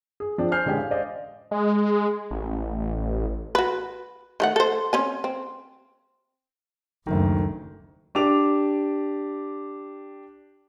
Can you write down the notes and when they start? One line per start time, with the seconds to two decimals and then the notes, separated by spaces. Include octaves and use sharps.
0.20 G#4
0.38 F3 C4 D4
0.51 C5 G#5 F6 G6 C7
0.65 A1 D3 G#3 C#4 G4 G#5
0.78 F5
0.91 C5 D5 D#5 F5
1.51 G#3
2.31 A1
3.55 F#4 B4
4.40 D#3 A3 F#5
4.56 A4 C5
4.93 C4 C#4 G#5
5.24 C4
7.07 F#1 D2 D#3
8.15 D4 G4 D6 F7